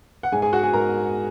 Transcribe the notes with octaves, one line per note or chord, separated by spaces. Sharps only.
F#5
G#2 G#3 G#4 G#5
G#4 G#5
F#4 F#5
G#4 G#5
G#2 G#3 A#4 A#5